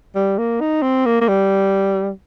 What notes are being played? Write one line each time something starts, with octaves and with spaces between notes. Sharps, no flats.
G3
A#3
D#4
C4
A#3
A#3
G3